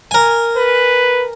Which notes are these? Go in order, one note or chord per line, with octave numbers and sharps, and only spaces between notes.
A#4 G#5
B4